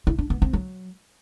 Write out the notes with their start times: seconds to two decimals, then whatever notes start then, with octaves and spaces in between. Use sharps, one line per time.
0.07 E4
0.18 D4
0.30 B3
0.42 C4
0.53 F#3